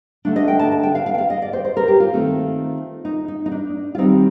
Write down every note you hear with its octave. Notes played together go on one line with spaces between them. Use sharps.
D3 A3 D4
D#5
G5
A5
A5
G5
F5
F5
G5
F5
D#5
D5
C5
C5
A#4
G4
F4
D#3 A3 C4
D#4
D#4
D#4
D4
F4
D#3 G3 C4 D#4